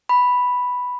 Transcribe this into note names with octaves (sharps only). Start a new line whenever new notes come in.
B5